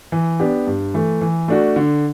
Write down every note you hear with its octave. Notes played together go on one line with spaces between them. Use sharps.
E3
B3 D4 G4
G2
E3 A3
E3
A3 D4 F#4
D3